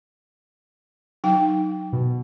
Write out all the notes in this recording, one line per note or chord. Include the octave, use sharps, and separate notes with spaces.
F#3 D#4 G5
B2